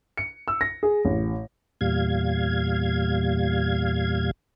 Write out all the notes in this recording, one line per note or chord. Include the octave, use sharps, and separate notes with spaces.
C#7
E6
A#6
G#4
A1
E2 A#2 G3 F5 G#6